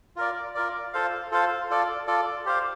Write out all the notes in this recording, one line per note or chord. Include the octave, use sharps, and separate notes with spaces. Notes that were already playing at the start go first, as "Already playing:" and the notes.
F4 A#4 D5
F4 A#4 D5
F4 A4 C5 F5
F4 A4 C5 F5
F4 A4 D5
F4 A4 D5
G4 C5 F5